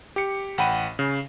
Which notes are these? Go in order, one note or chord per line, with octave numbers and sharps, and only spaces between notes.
G4 C#7
A1 F#5 G5 B5 D#7
C#3